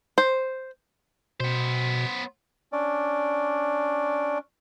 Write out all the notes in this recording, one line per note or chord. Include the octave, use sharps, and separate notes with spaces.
C5
B2 B3 C5
C#4 D4 D5